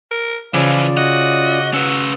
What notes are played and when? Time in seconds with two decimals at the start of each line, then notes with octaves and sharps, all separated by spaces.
0.11 A#4
0.54 C#3 E3 F3 C#4 F4 D5
0.97 F#4 D#5
1.74 C#4 B4 E6